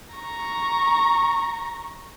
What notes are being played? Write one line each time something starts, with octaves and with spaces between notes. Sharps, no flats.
A#5 C#6